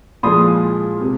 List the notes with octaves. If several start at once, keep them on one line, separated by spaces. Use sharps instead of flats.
A#2 F3 G#3 C6 D#6
C3